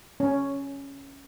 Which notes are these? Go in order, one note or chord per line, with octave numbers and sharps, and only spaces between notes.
C#4